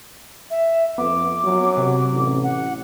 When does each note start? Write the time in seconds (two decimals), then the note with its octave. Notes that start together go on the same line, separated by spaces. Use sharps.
0.50 E5
0.98 F2 B3 D6
1.44 F#3
1.77 C3
2.13 A1
2.44 F#5